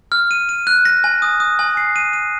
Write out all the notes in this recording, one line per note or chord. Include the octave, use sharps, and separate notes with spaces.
F6
D#7
D#7
F#6
A#6
G#5
D#6
D#6
G#5
C7
D#7
D#7